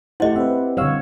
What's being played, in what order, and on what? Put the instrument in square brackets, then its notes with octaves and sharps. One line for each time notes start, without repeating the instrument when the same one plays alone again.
[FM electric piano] A3 C5 [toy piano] E4 D#5 [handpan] G4 F#5
[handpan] C4 [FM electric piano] B4 C5 E5
[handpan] D3 C#5 [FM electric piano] G3 F5 E6